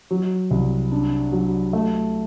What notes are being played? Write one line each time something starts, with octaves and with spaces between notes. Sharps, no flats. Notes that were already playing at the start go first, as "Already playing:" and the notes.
F#3
C2
D4
F#3
A3